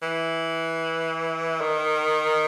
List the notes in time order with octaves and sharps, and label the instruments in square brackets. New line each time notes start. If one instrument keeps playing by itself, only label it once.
[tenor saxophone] E3
D#3